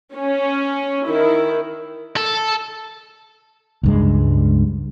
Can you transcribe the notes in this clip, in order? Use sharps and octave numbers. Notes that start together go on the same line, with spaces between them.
C#4
D#3 E4
A4
C#2 G2 G#3